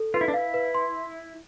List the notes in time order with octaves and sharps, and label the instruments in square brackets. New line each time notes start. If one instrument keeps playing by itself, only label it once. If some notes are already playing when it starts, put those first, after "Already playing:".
Already playing: [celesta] A4
[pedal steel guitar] F4 [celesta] B4
[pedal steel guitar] E4
D4
[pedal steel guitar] E4 [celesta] F5
[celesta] B4
C6